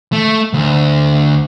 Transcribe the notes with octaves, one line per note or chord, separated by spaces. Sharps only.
A3
D2